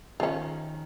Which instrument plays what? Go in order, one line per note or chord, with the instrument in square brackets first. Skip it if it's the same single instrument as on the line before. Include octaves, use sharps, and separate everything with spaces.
[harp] D#3 [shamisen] F3 C#4